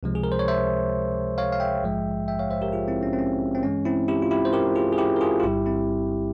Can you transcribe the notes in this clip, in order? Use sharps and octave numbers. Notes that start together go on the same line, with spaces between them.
C#2 C3 F3 G#3
G#4
A#4
C5
C#5
C5 E5
C#5 F5
F5
E5 G5
A#1 G#2 F3 G#3
E5 G5
C#5 F5
C5 E5
G4 A#4
F4 G#4
C4 E4
C#4
C4
C#4
C4
G2 E3 G#3 C#4
C4 E4
E4 G4
F4
E4 G4
C5
G4 A#4
F4 G#4
G#4
E4 G4
A#4
F4 G#4
F4
G1 G2 G3 E4 G4
C4 E4